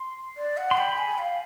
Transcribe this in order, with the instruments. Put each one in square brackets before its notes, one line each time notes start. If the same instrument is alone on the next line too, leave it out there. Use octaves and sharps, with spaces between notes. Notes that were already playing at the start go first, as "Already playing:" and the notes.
Already playing: [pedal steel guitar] C6
[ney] D5
F#5
[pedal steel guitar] C6
[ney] G5 [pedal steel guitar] B5
[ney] G#5
F5